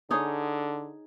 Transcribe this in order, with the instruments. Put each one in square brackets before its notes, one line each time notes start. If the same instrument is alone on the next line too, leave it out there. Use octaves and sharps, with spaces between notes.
[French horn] D3 [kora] D#4 G#4 C#5